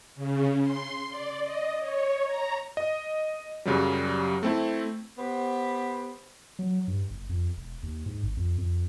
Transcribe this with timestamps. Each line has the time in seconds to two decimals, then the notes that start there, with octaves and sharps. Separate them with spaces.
0.16 C#3
0.62 C6
1.10 D5
1.43 D#5
1.79 C#5
2.25 A#5
2.77 D#5
3.65 F#2 C#3 F#3 G3
4.43 A3 C4 E4
5.18 B3 G4 C5
6.59 F#3
6.88 G2
7.10 F#1
7.29 F2
7.57 E1
7.83 D#2
8.06 G#2
8.23 G#1
8.37 F2
8.58 F2